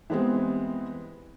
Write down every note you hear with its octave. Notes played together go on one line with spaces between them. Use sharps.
E3 G3 G#3 B3 C4